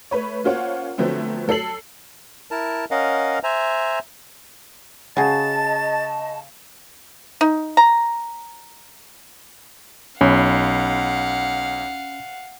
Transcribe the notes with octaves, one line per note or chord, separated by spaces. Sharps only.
A3 B4 C#5
A#3 C#4 F4 C5 C#5 F#5
D3 F3 F#3 A3 B3 C4
F#3 A4 E6 C7 F#7
E4 A#4 A5
C#4 A#4 D#5 F5 F#5
C5 E5 G#5 A#5
C#3 F#4 G#4 D#5 A5 A6
D#4
A#5
B1 C#4 F5 F#5 B5